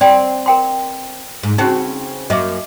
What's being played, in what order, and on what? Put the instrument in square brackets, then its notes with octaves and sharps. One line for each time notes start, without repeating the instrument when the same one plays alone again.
[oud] C4 [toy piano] D5 G5
[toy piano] A#4 G5 C6
[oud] G#2
[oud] C#3 C4 F#4 [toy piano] C#4 D#4
[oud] F#2 A#3 [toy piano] D#5 E5 D6